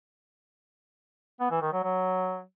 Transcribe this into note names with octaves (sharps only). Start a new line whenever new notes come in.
B3
E3
D#3
F#3
F#3